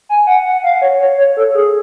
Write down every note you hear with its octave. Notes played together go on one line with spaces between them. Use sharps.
G#5
F#5
F#5
F5
C#5
C#5
C#5
A4
G#4